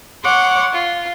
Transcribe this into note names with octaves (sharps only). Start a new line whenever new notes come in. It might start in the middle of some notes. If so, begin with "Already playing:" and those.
C#5 F#5 C6 D6
F4